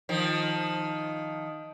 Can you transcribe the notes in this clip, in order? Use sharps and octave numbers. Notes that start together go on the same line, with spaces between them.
D#3 F3